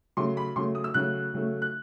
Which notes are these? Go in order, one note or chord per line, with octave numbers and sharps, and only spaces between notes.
C#3 F#3 A3 C6
B5
C#3 F#3 A3 C6
D#6
E6
C#3 F#3 A3 F#6
C#3 F#3 A3
F#6